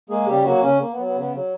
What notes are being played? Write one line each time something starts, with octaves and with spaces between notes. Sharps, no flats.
G#3 A#3 G#4
C#3 G3 G4
F#3 A#3 F#4
C#3 C#4
A#3
B3
F#3
B3
C#3
B3
F#3